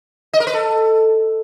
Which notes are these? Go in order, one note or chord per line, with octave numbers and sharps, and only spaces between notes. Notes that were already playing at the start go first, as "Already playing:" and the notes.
D#5
A#4
B4
A4